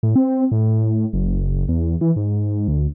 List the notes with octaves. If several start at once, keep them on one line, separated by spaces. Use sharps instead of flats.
A2
C4
A2
F#1
E2
E3
G#2
D2